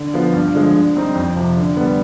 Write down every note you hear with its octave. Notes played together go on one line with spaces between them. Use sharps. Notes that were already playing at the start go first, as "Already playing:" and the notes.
Already playing: D3
F3 B3 F4
G2
D3 F3 G#3
D3
G3 C4 D#4
F2
C3 F3
D3
G3 B3